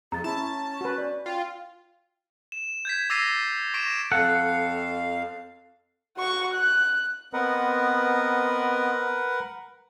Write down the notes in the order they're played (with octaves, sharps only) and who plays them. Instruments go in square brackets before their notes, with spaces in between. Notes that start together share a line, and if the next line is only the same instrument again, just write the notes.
[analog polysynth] F2 [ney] G#4 [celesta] A#5 A6
[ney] C#4 [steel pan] E4 [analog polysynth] A5
[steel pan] F#4 B4
[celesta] D5
[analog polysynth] F4 [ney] G5
[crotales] E7
G6 G#6 B6
D6 E6 A6 A#6 C7 D#7
C#6 A#6 B6 D7 E7
[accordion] F2 F5 [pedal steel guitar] A4 F#5
[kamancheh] F#4 C#6
F#6
[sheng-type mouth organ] B3 C4 D#5 [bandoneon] A#4 B4 F#5